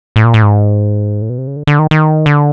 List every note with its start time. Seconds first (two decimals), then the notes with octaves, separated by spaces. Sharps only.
0.16 A2
0.24 A#2
0.34 A2
0.43 G#2
1.22 A2
1.30 B2
1.38 C3
1.47 C#3
1.56 D3
1.67 D3
1.79 D#3
1.91 D#3
2.26 D3